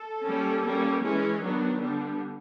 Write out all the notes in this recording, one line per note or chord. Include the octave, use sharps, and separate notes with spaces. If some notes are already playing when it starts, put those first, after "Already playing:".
Already playing: A4
G3 A#3 C#4
G3 A#3 C#4
E3 G#3 C#4
D#3 F#3 B3 D4
D3 G3 B3 D4